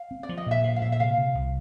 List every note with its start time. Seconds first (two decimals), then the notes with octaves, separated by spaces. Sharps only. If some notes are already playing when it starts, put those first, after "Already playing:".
Already playing: F5
0.11 C4
0.23 D5
0.29 F3
0.37 D#5
0.46 A#2 E5
0.64 F3 F5
0.76 F5
0.82 A#2 E5
0.92 E5
1.00 C3 F5
1.18 C3
1.35 C2